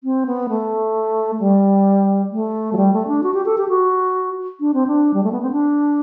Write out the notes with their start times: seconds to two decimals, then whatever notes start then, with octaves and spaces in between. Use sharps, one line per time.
0.04 C4
0.26 B3
0.49 A3
1.40 G3
2.32 A3
2.73 F#3
2.77 G3
2.93 A3
3.07 D4
3.23 F#4
3.34 G4
3.45 A4
3.58 G4
3.69 F#4
4.60 D4
4.74 C4
4.87 D4
5.14 G3
5.24 A3
5.32 B3
5.42 C4
5.51 D4